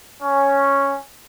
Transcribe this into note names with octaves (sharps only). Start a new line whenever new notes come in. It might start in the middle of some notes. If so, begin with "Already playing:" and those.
C#4